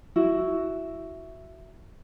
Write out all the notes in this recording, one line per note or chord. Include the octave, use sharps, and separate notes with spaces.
E4 F#4